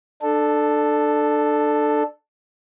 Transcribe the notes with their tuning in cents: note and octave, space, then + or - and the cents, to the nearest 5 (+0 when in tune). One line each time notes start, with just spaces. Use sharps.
D4 +25 A4 +0